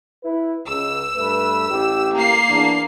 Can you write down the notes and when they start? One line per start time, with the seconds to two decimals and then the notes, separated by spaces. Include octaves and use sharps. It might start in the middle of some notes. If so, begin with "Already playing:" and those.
0.24 E4 B4
0.68 C#2 E6
1.15 G2 A3 B4
1.70 A1 G4
2.15 A#3 C7
2.49 E2 D4